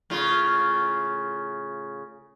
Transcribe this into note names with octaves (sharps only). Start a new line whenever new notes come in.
A2 C#3 F4